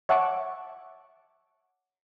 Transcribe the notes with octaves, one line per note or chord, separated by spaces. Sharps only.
C#5 E5 F#5 A5 C#6 D6